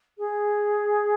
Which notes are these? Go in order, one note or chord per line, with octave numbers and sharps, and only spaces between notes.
G#4